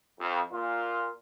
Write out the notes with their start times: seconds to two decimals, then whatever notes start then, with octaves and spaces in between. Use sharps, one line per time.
0.20 F2
0.53 A#2 F4